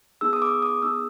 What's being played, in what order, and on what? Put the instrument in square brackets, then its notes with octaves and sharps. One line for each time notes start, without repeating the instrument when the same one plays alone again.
[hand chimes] B3 D#4 G#4 E6
D#6
D6
D#6
B3 D#4 G#4 E6